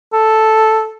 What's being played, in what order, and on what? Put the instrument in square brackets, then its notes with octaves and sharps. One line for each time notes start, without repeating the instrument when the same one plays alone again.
[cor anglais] A4